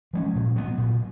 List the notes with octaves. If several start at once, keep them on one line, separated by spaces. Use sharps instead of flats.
F3 G#3 C#4
A#2
F#3 B3
A#2